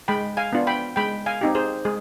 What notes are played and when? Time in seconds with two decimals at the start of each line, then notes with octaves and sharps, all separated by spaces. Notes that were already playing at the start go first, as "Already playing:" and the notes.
0.08 G#3 G5 B5
0.37 F5 G#5
0.53 B3 D4 F4
0.67 G5 B5
0.96 G#3 G5 B5
1.26 F5 G#5
1.41 C4 D#4 G4
1.55 G#4 C5
1.85 G#3 G#4